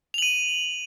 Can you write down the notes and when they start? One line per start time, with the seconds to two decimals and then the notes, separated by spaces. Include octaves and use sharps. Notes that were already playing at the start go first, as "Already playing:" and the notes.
0.14 F7
0.18 F#7
0.22 D#7